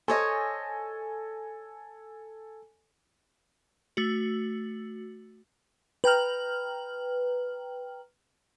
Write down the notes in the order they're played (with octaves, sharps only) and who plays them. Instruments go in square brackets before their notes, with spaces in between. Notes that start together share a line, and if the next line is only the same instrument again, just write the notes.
[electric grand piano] A4 G#5 [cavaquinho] C5 C#5 D#5
[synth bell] A3 F#4
[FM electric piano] B4 G5 A#5 F6